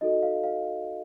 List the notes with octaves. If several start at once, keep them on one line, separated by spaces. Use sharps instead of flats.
D#4 F#4 A4 D#5
F5
F5